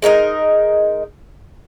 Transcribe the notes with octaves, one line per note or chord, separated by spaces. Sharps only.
G#3 D#4 A#4 D#5